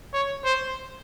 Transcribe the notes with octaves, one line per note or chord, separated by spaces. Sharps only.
C#5
C5